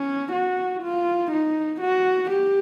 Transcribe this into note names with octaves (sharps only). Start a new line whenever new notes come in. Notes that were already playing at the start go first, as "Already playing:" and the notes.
Already playing: C#4
F#4
F4
D#4
F#4
G4